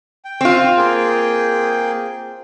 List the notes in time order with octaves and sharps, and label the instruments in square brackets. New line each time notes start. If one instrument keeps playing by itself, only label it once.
[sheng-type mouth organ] G5
[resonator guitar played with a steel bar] C4 F4
[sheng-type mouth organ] A#3 G#4 G5